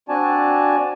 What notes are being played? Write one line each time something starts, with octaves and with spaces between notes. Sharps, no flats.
C4 D4 F#4 D5 G#5 A5